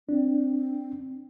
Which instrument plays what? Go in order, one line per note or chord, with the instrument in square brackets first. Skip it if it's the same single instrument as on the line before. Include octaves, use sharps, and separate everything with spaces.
[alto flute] C4 [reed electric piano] D4